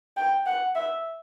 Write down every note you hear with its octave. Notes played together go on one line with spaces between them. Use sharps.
G5
F#5
E5